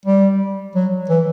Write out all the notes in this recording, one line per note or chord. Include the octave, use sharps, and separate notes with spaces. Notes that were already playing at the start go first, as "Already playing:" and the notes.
G3
F#3
E3